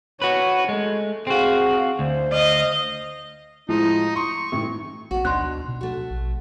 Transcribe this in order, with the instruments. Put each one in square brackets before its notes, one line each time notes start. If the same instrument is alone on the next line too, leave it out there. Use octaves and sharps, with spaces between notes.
[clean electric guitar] F#4 B4 [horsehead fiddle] C#5
[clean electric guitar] G#3 [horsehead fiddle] A3
[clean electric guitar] C4 F#4 [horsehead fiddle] G#4 F5
[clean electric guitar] D2 [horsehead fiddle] C5
[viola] D#5 F5
[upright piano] A2 F3 G#3 [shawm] D#4
[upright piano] C6 [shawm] C#6
[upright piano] A1 G#2
[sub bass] A1 [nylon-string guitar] B3 F#4
[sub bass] D2 [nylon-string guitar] B2 D4 D#4 [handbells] C6 F#6
[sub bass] B2
[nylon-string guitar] A3 F#4
[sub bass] A#1